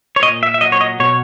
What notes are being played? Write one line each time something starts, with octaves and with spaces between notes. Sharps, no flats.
C#5
A#2 D#5
E5
E5
F#3 D#5
C#5
D#5
B2 C#5